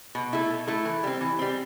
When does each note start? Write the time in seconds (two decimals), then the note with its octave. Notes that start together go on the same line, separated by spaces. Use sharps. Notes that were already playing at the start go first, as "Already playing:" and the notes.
0.15 B2
0.32 A3 E4 A4
0.50 B2
0.67 A3 E4 A4
0.85 E3
1.03 G3 C4
1.21 E3
1.39 G3 C4